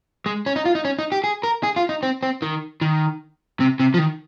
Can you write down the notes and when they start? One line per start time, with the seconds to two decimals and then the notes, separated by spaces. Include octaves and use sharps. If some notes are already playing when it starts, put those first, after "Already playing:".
0.26 G#3
0.46 C#4
0.56 D#4
0.65 F4
0.75 D#4
0.85 C#4
0.99 D#4
1.12 G4
1.24 G#4
1.43 A#4
1.63 G#4
1.76 F4
1.89 D#4
2.03 C4
2.23 C4
2.42 D#3
2.81 D#3
3.60 C3
3.80 C3
3.94 F3
3.98 D#3